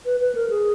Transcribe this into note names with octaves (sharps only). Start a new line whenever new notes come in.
B4
B4
A#4
G#4